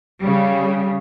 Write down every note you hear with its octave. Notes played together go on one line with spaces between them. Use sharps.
C#3 G3